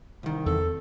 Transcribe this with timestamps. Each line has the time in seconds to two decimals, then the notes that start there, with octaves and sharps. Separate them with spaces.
0.23 C2 D#3
0.46 E2 C4 A4